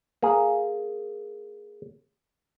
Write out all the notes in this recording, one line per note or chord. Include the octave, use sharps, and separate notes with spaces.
A#3 G#4